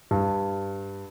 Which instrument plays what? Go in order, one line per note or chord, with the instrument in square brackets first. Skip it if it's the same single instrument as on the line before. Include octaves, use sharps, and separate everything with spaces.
[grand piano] G2